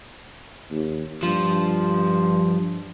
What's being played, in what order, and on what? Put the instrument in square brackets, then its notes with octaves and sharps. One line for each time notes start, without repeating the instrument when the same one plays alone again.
[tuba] D#2
[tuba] G2 [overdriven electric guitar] F3